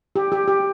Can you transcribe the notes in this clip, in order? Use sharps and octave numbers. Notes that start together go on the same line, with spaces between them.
G4
G4
G4